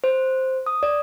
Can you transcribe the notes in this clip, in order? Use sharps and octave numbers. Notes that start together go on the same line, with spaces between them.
C5
D#6
D5